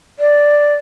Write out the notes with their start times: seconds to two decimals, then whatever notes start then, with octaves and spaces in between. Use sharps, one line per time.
0.19 D5